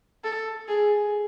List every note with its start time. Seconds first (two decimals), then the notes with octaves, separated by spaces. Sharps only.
0.24 A4
0.68 G#4